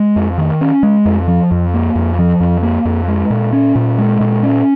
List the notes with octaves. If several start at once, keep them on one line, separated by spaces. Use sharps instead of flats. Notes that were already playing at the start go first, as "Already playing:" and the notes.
Already playing: G#3
F2
D#3
C#4
G#3
F2
F3
F2
A#3
F2
F3
F2
A#3
F2
G#3
A#2
C#4
A#2
G#3
A#2
C#4